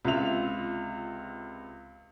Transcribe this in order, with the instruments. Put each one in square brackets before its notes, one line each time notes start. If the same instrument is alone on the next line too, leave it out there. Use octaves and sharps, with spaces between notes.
[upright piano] C#2 C3 F4 E5 F7